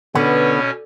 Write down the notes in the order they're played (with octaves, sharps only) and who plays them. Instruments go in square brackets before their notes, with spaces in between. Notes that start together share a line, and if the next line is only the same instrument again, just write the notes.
[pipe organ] B2 C#4 C#5 [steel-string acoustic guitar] D3 [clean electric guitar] B3 [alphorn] B4